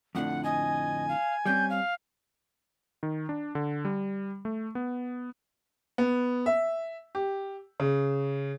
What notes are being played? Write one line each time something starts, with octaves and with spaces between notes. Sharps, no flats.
F2 A2 D3 F#5
D#5 G#5
F5
G3 C4 C#4 G6
F5
D#3
D4
D3
G3
A3
B3
B3
E5
G4
C#3